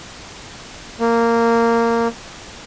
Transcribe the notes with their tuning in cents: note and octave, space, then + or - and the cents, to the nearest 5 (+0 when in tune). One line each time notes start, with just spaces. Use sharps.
A#3 -10